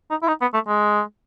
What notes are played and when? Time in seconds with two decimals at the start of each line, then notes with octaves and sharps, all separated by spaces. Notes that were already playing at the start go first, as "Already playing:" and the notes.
0.10 D#4
0.23 E4
0.28 D#4
0.41 B3
0.54 A3
0.67 G#3